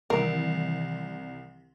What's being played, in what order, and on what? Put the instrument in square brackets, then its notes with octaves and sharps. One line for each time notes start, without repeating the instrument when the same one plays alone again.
[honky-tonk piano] C2 [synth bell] D#3 E3 C4 [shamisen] A#4